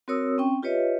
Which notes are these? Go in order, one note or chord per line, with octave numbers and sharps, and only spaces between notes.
C4 F#4 A#4 C#5 D#6 E6
C4 C#4 G5 C#6
F4 G4 B4 C#5 D#5 E5